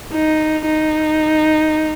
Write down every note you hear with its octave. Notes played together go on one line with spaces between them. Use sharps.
D#4
D#4